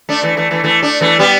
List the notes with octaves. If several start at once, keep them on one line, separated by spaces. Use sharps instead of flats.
A3 D4
E3 A3
E3 A3
E3 A3
E3 A3
A3 D4
E3 A3
G3 B3